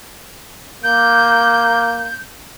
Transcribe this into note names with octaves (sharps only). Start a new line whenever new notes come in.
A#3 G6